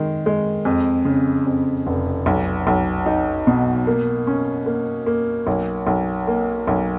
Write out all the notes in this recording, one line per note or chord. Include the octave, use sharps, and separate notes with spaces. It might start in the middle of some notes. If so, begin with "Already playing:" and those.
Already playing: D#3 G#3
G#3
F2
C#3
F2
F1
B1
B1
D#4
B2
A#3
C#4
A#3
A#3
B1
B1
A#3
B1